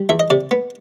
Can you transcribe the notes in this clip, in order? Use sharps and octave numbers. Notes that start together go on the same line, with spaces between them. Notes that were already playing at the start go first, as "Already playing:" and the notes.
Already playing: G3
E2 E5
D#5
C3 D5
B3